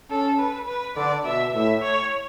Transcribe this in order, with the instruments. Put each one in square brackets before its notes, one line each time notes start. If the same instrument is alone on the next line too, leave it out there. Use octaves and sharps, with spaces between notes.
[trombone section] C#4 [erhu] A4
[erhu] B4
B4
[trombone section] D3 [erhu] D5
[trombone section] B2 [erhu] E5
[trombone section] A2 [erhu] E5
[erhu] C#5